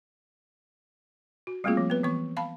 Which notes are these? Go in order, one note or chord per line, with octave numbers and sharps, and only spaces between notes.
F#4
G3 A3 A#3 C4 F4 G#4
F3
B3 B4
E3 B3 C#6
F5 A5 B5